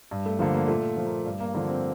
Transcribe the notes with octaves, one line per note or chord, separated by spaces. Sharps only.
G2
A3
D3 F3 A#3
A#3
A#2 A3
F3
A#3
G2
A#3
D3 F3 A#3
C4